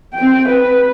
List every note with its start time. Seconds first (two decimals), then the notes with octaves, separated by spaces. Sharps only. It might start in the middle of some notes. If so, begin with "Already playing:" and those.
0.14 C4 G5
0.49 B4